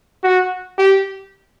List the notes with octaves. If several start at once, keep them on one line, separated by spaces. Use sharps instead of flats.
F#4
G4